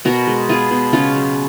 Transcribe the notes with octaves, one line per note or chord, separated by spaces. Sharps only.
B2 F#4 A#4
G#3
B3 F4 G#4
B2
C#3 C#4 F4
F#3